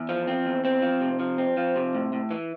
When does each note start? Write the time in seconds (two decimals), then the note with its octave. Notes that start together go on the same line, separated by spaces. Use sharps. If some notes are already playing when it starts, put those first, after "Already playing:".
Already playing: E2
0.09 F3
0.27 C4
0.46 E2
0.65 C4
0.82 F3
1.01 C3
1.19 F3
1.38 C4
1.57 F3
1.76 C3
1.95 A2
2.13 A2
2.31 E3